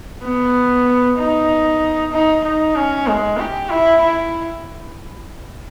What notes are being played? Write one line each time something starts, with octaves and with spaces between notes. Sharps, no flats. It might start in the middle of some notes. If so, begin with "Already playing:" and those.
B3
D#4
D#4
D#4
C#4
G#3
G4
E4
E4